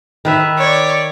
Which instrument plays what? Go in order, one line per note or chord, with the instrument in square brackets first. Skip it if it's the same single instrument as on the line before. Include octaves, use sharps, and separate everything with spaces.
[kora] D#3 B4 E5
[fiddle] C#5 D5